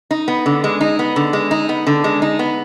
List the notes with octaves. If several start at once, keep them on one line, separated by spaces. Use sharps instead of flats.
D#4
B3
D3
G#3
D#4
B3
D3
G#3
D#4
B3
D3
G#3
D#4
B3